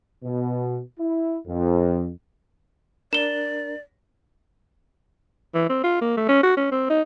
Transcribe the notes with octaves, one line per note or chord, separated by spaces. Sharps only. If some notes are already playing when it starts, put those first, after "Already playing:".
B2
E4
F2
D4 A#4 D5 E7 G7
E3
C4
F4
A#3
A3
C#4
F#4
C#4
C4
D#4